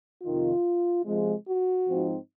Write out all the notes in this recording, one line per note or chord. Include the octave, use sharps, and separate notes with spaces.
F2 C3 D#3 F4
C3 F3 G#3
F#4
G#2 F3 C4 D#4